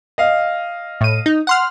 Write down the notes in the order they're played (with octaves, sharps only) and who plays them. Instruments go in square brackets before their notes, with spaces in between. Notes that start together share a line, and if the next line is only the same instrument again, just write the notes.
[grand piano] D#5 F5
[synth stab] A2 D#7
D#4
F#5 C6 F6